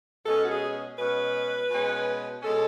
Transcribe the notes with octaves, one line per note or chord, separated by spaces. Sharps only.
B2 G#3 C#4 A4
F#4
G#4
B2 G#3 C#4 B4
B2 G#3 C#4
B2 G#3 C#4 A4